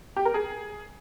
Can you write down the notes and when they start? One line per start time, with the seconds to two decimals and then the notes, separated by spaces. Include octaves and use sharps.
0.16 G4
0.25 A#4
0.34 G#4